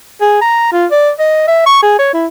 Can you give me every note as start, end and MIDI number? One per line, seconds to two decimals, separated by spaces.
0.21 0.41 68
0.42 0.70 82
0.72 0.86 65
0.91 1.10 74
1.19 1.44 75
1.48 1.65 76
1.66 1.81 85
1.82 1.97 68
1.99 2.11 73
2.13 2.27 64